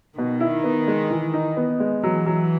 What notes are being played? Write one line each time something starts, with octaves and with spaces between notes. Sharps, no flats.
B2 D#3
E4
B3
G#3
E3
D#4
B3
G#3
E3 F#3
F#3